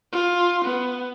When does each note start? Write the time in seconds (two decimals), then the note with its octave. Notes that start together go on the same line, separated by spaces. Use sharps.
0.13 F4
0.65 B3